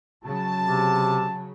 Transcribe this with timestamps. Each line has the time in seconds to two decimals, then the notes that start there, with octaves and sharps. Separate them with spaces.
0.24 C#3 F#3 A5
0.64 C3